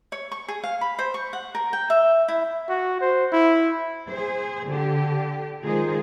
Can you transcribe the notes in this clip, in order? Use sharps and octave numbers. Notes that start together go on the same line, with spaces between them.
C#5
C#6
G#4
F5
B5
C5
C#6
F#5
A#4
G5
E5
E4
F#4
C5
E4
G#4 C5
D3 G4
D#3 G#3 F4 G#4 C5